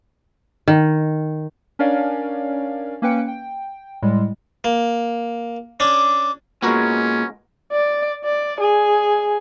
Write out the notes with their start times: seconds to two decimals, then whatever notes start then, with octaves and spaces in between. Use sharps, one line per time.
0.68 D#3
1.79 C#4 D4 A#4 C#5 D5 F5
3.02 A#3 C#4 B4 G5 C#7
3.28 G5
4.02 A2 G3 G#3
4.64 A#3
5.80 C#4 D4 D6
6.62 A#2 G#3 B3 C#4 F#4 A#4
7.72 D5
8.24 D5
8.60 G#4